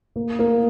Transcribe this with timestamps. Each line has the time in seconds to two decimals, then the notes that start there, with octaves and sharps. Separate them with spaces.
0.16 A#3
0.39 A#3